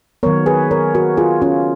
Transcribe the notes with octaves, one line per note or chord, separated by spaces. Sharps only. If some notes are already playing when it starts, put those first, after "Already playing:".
D#3 F#3 B3 A#4 C#5
G#4 B4
A#4 C#5
F#4 A#4
F4 G#4
C#4 F4